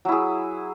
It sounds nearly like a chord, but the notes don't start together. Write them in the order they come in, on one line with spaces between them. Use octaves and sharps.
F#3 E4 G#4